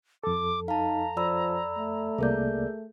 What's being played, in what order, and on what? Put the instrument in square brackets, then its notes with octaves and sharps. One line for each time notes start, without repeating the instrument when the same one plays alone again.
[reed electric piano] F2 A4 [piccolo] D6
[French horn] D#4 [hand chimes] F5 A5 [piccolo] A#5
[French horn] F3 [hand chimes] D5 B5 E6
[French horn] A3
[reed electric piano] C2 A#3 D5 [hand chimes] G#4 A#4 G6